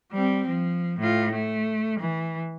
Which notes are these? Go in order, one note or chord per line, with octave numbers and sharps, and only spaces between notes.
G3 C4
F3
A2 F4
A3
E3